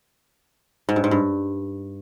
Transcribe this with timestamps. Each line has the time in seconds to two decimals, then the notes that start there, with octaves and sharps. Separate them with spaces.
0.89 G#2
0.96 G2
1.04 G#2
1.11 G2